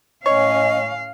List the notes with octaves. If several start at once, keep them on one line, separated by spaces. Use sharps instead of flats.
A2 C#4 C#5 D#5 F5